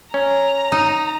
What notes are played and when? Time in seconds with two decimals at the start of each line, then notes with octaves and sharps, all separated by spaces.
0.14 C#4 A#5
0.72 D#4